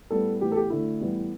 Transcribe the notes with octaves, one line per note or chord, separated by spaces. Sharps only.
A2 G3 B3 A4
A2 E3 B3 G4
A4
G4
D2 D3 A3 E4
A2 E3 G3 B3